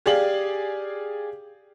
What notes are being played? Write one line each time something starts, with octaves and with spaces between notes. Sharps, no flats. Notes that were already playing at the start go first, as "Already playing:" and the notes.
G4 G#4 D5 F5 F#7